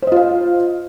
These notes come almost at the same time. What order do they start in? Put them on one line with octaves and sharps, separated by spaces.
C5 D#5 F4 F5